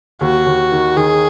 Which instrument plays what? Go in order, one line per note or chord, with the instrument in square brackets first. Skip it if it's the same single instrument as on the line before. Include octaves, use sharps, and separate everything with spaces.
[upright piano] D#2 [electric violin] F#4
[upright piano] D#2
D#3
[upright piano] D#3 [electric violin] G#4